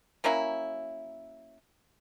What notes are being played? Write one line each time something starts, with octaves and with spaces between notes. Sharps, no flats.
F#3 A#3 C#4 E4